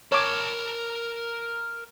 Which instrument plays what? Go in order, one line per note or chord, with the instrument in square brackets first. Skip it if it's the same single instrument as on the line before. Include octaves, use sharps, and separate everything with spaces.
[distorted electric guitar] A#4 A5 [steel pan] C#5 D6